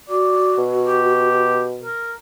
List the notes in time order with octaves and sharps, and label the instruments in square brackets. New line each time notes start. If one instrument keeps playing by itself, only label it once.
[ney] F#4 [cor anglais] D5
[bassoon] B2
[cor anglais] G4
A#4